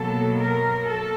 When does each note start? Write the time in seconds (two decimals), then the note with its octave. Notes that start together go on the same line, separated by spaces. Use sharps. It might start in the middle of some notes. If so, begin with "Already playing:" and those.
Already playing: B2 F#3 A#3 A4
0.40 A#4
0.85 A4